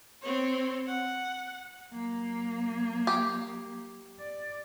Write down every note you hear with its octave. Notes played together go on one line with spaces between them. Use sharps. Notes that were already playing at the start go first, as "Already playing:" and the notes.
C4 C#5
F#5
F#3 A#3
G4
D5